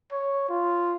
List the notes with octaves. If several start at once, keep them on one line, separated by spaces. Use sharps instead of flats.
C#5
F4